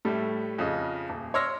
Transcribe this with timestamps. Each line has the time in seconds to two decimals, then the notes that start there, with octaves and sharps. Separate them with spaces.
0.05 A2 G3 A3
0.58 F2 C#3 D#5
1.10 D#1
1.34 C#5 D5 C6 E6 F6 A#6